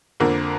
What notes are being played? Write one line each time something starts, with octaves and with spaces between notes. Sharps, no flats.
F2 D3 A#3